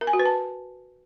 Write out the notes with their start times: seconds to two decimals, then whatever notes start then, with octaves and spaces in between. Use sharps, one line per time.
0.01 A#4
0.07 G#5
0.13 F#4
0.19 B4
0.25 A5